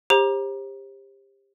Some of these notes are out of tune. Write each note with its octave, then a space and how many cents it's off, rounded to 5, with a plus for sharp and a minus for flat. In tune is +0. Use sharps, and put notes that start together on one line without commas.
G4 +25 C5 +35 A#5 +25